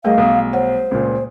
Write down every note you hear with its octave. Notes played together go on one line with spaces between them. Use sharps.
G3 A3 G#4 A#4 D#5 F5
B1 D#6
C5 C#5 F#5
C#2 A#2